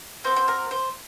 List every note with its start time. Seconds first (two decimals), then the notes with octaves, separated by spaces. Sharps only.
0.24 C4 F#4 C5
0.36 C5
0.48 A#4
0.71 C5